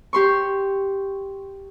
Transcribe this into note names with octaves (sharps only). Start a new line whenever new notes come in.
G4 C6 C#6